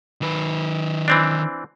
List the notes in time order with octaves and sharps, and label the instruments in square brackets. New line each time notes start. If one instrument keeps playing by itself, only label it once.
[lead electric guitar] D#3 B4
[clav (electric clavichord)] E3 C4 D4